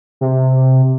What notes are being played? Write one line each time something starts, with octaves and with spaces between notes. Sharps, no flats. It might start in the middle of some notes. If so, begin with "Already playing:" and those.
C3